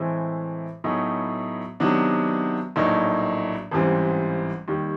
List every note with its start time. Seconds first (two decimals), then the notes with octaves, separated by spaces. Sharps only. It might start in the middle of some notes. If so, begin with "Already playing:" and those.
Already playing: A2 E3 G#3 C4
0.84 A2 F#3 B3 D#4 G#4
1.80 C3 D#3 F#3 B3 D4
2.76 A#1 A2 F#3 A#3 D#4
3.72 A1 G#2 E3 G3 C4
4.68 D#2 D#3 G3